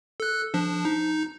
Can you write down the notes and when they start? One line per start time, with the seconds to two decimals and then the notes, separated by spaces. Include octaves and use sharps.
0.20 A4 F#6
0.54 F3 D4
0.85 D#4